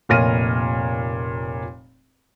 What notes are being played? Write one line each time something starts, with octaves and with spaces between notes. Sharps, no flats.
F1 A#2 C#5 F6 A#6 D#7